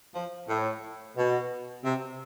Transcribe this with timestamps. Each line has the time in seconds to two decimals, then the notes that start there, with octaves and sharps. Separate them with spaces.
0.15 F3
0.48 A2
1.17 B2
1.84 C3